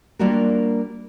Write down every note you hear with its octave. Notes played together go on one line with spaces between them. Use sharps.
G3 A#3 D4 F4 F#4 A#4